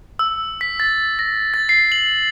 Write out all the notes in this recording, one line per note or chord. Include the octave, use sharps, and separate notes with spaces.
E6
B6
A6
A#6
A6
C7
F#7